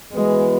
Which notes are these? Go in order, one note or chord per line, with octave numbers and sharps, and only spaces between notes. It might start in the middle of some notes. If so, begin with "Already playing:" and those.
E3 G#3 B3 F#4 B4